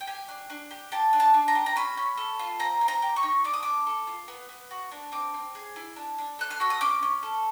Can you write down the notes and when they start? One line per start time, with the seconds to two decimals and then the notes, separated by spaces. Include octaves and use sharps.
0.01 G5
0.07 G4 G#5
0.28 D4
0.50 D4
0.71 G4
0.92 G4 A5
1.13 D4
1.20 A5
1.34 D4
1.48 A#5
1.55 G4
1.66 A#5
1.76 C#4 B5
1.97 C#4
2.17 A4
2.39 F4
2.59 C4 A#5
2.81 C4
2.88 A#5
3.02 G4
3.16 C#6
3.23 D#4
3.44 D4 D6
3.53 D#6
3.63 D4 D6
3.87 A4
4.07 F4
4.28 B3
4.49 B3
4.71 F#4
4.91 D4
5.12 C4 D6
5.34 C4
5.55 G#4
5.76 E4
5.96 D4
6.18 D4
6.39 A4 F#6
6.50 F6
6.60 F#4 E6
6.70 D#6
6.81 C#4 D6
7.03 C#4
7.23 A4